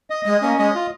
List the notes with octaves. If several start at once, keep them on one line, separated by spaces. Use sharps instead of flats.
D#5
G#3 D#5
A#3 C#4
G#3 D#5
F4